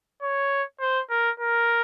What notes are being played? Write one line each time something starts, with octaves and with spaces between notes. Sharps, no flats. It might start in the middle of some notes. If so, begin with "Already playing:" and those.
C#5
C5
A#4
A#4